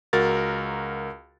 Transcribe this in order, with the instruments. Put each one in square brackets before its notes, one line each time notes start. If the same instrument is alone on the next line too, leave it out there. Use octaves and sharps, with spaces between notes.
[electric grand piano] C#2 F#4 A#4 A6